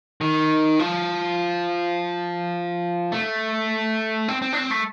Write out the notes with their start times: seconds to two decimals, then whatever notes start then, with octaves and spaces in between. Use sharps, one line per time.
0.21 D#3
0.79 F3
3.12 A3
4.28 C4
4.42 C4
4.53 D4
4.57 C4
4.71 A3